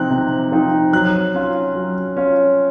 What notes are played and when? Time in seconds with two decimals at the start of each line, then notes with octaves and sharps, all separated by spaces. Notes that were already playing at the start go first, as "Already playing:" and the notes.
Already playing: C3 F3 C4 D#4 F#6
0.10 C3
0.52 F3 C4 D#4
0.93 F#3 F#6
1.34 C#4 F4
1.75 F#3
2.17 C#4 F4